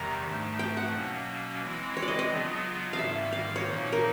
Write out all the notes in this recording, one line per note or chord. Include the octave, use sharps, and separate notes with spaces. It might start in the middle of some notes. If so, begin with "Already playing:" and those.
Already playing: E2 C3 D#3 G3 A#5
G#2 F3 A3 D4
G5
F#5
B2 F#3 A#3 C#4
E3 G#3 C4 E4
C#5
D5
D#5
D#5
C#3 F#3 B3 D4 F4
F5
G#2 D#3 G3 A#3 E5
F5
C#5
A#2 F3 A#3 D#4
A#4